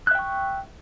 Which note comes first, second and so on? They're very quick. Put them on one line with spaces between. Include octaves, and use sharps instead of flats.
F#6 E5 G5 C#6